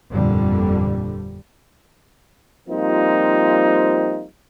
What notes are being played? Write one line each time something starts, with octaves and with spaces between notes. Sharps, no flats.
G1 F2 A#2 D3 G3
F3 G3 A#3 C4 D#4 F4